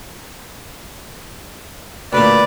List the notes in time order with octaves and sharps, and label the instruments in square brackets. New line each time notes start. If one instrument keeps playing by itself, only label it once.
[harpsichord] D2 A#2 [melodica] B4 [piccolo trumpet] D5